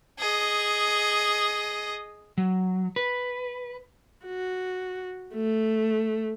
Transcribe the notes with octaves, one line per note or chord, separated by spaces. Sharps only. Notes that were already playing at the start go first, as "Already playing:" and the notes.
G#4 D#5
F#3
B4
F#4
A3